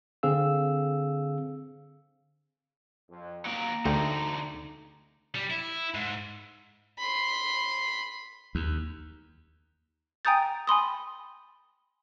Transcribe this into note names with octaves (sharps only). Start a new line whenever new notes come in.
D3 C4 G#4 F5 E6
F2
F#3 A#3 G5 A#5
D2 D3 A3 D#4 G5
G3
E4
G#2
B5 C6
D#2
G5 G#5 A#5 D#6 G6 A6
G#5 B5 C6 D#6